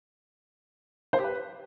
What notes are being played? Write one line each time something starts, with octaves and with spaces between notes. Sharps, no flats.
C5
G4
B4